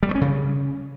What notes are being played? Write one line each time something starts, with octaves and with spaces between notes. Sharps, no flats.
G3
A3
C#4
C#3